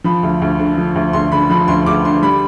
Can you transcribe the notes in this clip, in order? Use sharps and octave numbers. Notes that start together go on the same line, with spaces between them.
F3 B5
D2
D2
D3
F3
D2
D2 C6
D3 B5
F3 B5
D2 C6
D2 D6
D3 C6
G3 B5